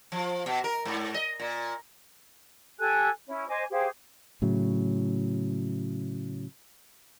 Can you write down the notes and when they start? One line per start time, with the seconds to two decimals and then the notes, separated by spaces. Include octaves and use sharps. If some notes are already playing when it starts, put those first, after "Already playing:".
0.12 F3
0.46 B2
0.64 A#4
0.85 G#2
1.14 D#5
1.40 A#2
2.79 G4 A4 G#5 F#6
3.27 C#4 E4
3.48 C5 D#5 G#5 D6
3.71 G4 G#4 C5 F5
4.42 A2 C#3 F#3